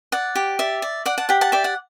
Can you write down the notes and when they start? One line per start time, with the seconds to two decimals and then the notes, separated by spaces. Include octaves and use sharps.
0.12 D5 F#5
0.35 G4
0.59 D5 E5
0.82 D5
1.06 D5 F#5
1.18 F#5 A5
1.29 G4 F#5
1.41 F#5 A5
1.52 D5 E5 G5
1.64 F#5